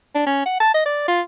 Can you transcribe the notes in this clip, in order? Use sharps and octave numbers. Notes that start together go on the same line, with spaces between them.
D4
C#4
F#5
A5
D#5
D5
F4